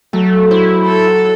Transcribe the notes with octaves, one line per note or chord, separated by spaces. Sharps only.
F#3 A3 A4
E4 C5
A4